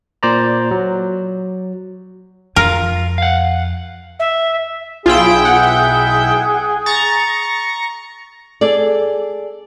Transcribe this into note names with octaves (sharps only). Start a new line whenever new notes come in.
A#2 C5 D5 A#5
F#3
F2 F4 A#4
F5 F#5
E5
B1 E4 F4 G#4 G5
F#5
A#5 C#6 A6
G#4 A4 D5